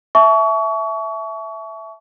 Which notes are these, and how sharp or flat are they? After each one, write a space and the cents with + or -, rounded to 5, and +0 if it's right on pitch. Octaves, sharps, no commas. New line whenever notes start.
E5 +0 A5 -30 C#6 +30